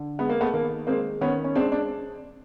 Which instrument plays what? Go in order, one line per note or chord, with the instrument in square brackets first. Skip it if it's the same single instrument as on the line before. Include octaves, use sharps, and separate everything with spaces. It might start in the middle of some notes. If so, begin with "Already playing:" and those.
Already playing: [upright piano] D3
G#3 B3
A#3
A3 B3
D#3 A#3
G#3 A#3 C4
D#3 B3 C#4
C#4
G#3 C4 D4
D4